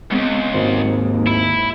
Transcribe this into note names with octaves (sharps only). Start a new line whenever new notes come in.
C#2 F#2 G#3 B3 C4
G#1 D#2 G#2 C5
G#3 E4